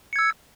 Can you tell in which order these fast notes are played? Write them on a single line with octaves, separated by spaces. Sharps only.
C#7 G#6 E6